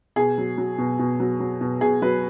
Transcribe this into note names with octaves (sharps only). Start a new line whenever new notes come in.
B2 G#4
F#3
F#3
B2
B2
F#3
F#3
B2
B2 G#4
F#3 B4